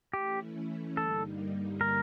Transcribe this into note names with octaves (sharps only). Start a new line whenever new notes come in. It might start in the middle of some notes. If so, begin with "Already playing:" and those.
E3 A3 C#4 E4 G4
G2 D3 G3 A#3 D#4 A4
A#4